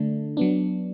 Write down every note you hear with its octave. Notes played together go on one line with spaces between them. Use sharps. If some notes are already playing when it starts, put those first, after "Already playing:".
Already playing: D3 A3 D4
F#3 B3 D4